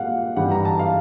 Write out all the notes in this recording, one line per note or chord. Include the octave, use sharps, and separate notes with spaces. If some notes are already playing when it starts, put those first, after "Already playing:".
Already playing: A#2 G3 F5 F#5
G2 E3 G3 F#5
A#5
A5
F5